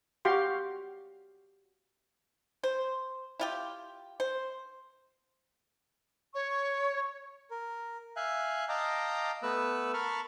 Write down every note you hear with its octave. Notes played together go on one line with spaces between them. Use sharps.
F#4 G4 F5 C6
C5
E4 F4 G4
C5
C#5 C#6
A#4
E5 F5 G#5 F#6
D#5 F5 G5 A5 A#5 D6
A3 B3 B4 E6 F#6
A#4 A5 B5 C#6 F6